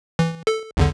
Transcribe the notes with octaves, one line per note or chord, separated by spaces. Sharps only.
E3
A4
B1 E2 D3